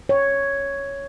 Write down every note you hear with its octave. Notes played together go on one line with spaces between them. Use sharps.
C#5